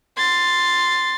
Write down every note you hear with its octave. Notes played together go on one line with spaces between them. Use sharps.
C6 A6